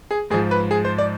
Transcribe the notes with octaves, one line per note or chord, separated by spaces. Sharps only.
G#4
G#2 F3 G#4
B4
G#4
C5
D5